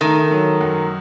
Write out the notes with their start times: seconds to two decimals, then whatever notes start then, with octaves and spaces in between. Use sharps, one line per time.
0.01 D#3 A3
0.31 F#3
0.61 F#2